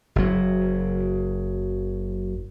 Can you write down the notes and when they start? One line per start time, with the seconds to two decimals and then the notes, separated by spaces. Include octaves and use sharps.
0.16 F#1 F#3